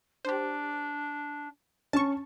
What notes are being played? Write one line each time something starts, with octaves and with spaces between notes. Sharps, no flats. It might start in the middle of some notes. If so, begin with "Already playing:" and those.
D4 G4 C5
C#4 A5 C#6